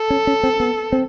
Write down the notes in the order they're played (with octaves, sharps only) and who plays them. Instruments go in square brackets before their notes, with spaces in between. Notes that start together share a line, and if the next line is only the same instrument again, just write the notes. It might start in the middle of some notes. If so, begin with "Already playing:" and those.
Already playing: [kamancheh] A4
[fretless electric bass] C#4
C#4
C4
B3
C4